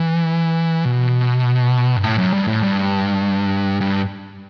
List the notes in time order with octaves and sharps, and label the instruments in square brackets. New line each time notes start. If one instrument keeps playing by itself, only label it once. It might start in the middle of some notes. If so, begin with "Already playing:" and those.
Already playing: [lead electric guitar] E3
B2
G2
A2
F#2
G2
A2
G2
G2